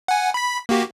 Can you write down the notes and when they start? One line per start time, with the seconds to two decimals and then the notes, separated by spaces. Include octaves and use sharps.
0.08 F#5 G#5
0.34 B5 B6
0.69 A#3 F#4 G4